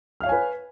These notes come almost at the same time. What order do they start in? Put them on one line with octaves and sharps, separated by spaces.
F6 F5 C#5 G#5 B4